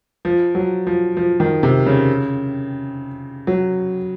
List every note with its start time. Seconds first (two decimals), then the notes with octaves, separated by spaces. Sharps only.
0.25 F3
0.55 F#3
0.87 F3
1.17 F3
1.40 D#3
1.63 C3
1.86 C#3
3.47 F#3